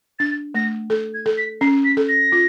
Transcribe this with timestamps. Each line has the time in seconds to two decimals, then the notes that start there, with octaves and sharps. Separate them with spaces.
0.19 D4 A6
0.55 A3 A#6
0.90 A4
1.14 G#6
1.26 A4
1.38 B6
1.61 C#4 C7
1.85 B6
1.97 A4
2.09 A#6
2.32 F4